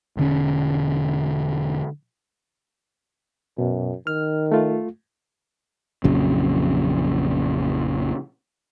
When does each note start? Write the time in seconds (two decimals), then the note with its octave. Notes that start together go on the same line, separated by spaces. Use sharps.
0.17 E1 D3 C#4
3.58 F#2 B2
4.07 D#3 F6
4.52 A3 F4
6.04 A#1 F2 C#3 F#3